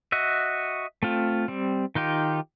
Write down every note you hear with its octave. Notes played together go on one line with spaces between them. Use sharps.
F#4 D#5 E5
A3 C4 F4
G3 C4
D#3 D#4 F4 G4